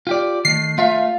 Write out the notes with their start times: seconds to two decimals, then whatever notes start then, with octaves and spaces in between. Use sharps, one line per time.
0.07 F4 G4 D5
0.45 D#3 A3 C7
0.78 A3 F4 E5 F5